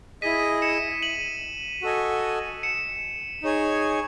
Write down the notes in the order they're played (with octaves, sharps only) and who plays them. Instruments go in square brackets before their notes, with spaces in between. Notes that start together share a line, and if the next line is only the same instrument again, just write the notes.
[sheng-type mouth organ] E4 G#4 D#5 [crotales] B6 D#7
[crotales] C#7 E7
D#7 F#7
[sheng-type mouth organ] F#4 A4 D#5 G#5
[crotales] C#7 E7
[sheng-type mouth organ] D#4 G#4 C#5 G#5